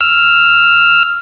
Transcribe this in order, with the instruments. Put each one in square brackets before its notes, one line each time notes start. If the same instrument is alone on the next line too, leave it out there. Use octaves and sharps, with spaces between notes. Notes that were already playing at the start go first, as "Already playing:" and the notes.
[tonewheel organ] E6 F6